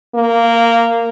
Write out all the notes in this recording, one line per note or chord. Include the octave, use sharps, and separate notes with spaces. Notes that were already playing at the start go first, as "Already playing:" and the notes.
A#3